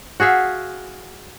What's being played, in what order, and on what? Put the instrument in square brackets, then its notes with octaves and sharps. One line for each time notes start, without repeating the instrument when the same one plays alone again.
[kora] F#4 G#4 E5 F5